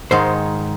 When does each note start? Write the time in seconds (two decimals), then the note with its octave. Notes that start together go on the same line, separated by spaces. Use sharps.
0.11 G#2 D#3 G#3 C5